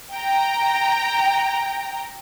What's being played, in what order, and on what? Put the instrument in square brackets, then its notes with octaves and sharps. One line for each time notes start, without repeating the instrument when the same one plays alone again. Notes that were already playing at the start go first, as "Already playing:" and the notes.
[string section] G5 A#5